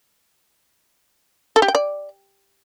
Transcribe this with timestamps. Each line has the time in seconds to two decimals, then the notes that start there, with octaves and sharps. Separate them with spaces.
1.56 A4
1.62 G4
1.68 G5
1.75 D5